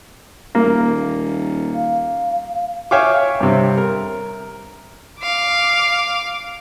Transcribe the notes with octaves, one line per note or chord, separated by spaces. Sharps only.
D#1 A#3
F5
C#5 E5 F5 G5 G#5 D6
G2 C3
A#4
F5 D6